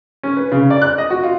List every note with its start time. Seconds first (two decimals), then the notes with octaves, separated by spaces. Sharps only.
0.23 C#4
0.37 B4
0.52 C#3
0.70 D5
0.82 F#6
0.98 D#5
1.11 F#4
1.24 F4